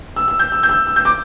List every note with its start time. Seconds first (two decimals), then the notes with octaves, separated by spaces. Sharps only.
0.16 E6
0.28 E6
0.39 G6
0.52 E6
0.63 G6
0.69 E6
0.87 E6
0.96 G6
1.05 D6